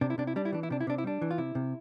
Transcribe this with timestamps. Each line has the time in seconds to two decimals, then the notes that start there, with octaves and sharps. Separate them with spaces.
0.01 C3 D4
0.10 E4
0.18 C3 D4
0.27 E4
0.36 G3 D4
0.45 E4
0.52 E3 D4
0.63 E4
0.70 C3 D4
0.81 E4
0.87 C3 D4
0.98 E4
1.04 G3 D4
1.21 E3
1.31 F4
1.38 C3 E4
1.55 C3